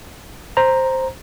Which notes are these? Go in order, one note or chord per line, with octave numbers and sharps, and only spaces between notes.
C5 A#5